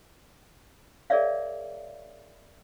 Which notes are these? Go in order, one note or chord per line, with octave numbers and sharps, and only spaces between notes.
G#4 A#4 C#5 D5 E5 F5